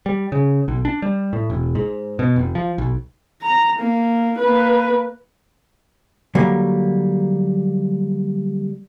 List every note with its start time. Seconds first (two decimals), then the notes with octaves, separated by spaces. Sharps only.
0.06 G3
0.32 C#3
0.68 B1
0.85 D4
1.02 G3
1.33 A2
1.50 E1
1.75 G#2
2.19 B2
2.36 F1
2.55 F3
2.78 B1
3.42 A#5
3.79 A#3
4.38 A#3 B4
6.35 D3 F#3 G3 A#3